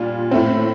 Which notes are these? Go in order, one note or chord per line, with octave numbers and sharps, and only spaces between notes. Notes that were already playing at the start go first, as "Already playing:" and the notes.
Already playing: A#2 G3 D4 F4
A2 A3 C4